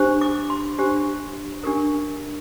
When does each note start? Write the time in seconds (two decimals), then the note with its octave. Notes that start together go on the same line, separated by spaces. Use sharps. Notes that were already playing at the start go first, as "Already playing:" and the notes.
Already playing: D4 G4 C5
0.21 D6
0.50 C6
0.78 D4 G4 C5
1.64 D4 G4 A#4